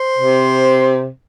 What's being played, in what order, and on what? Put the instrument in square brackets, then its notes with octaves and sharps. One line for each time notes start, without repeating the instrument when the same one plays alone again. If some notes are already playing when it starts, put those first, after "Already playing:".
Already playing: [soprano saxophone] C5
[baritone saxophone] C3